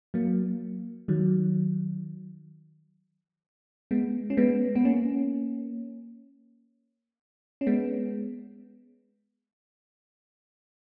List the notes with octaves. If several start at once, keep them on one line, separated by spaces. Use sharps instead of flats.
F#3 A#3
D#3 F#3
G#3 B3
C#4
G#3 B3
B3
A#3 C#4
C#4
G#3 B3